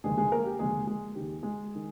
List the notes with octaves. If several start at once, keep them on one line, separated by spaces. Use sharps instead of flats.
F1 D#2 D3 G#3 G#4
G#3 G#4
A#3 A#4
G4
F1 D#2 D3 G#3 G#4
G#3 G#4
D#2 D#3 G4
G#3 G#4
D#3